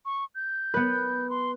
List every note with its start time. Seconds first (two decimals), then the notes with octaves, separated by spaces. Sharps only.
0.05 C#6
0.35 G6
0.74 B3 B4
1.30 C6